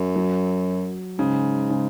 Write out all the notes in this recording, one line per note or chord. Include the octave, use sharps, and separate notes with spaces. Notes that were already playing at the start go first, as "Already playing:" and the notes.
Already playing: F#2
F#3
G#2 C#3
C#3